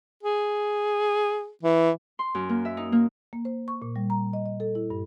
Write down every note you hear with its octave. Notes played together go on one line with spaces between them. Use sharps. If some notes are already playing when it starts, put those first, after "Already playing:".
G#4
E3
C6
F#2
A#3
E5
D#4
A#3
A#3
C5
C#6
A#2
G3
A#5
D#5
D#5
A4
E4
G2